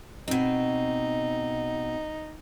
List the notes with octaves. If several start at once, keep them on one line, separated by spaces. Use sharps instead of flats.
B2 C4 D#4